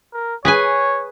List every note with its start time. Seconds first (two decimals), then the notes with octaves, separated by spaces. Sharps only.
0.14 A#4
0.45 G#4 B4 C#5 G#5